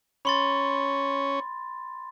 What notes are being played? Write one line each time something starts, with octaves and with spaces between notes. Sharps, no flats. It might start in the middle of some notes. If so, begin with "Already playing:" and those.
C#4 C#5 B5 C6 A6